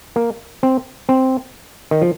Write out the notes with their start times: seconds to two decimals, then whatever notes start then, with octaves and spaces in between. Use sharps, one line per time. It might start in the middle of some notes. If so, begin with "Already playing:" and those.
0.16 A#3
0.63 C4
1.09 C4
1.91 D#3
2.02 F3